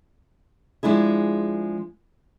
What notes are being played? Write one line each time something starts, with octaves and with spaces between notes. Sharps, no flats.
F3 G#3 D4 E4 G#4